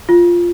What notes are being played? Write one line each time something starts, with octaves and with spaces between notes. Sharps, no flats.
F4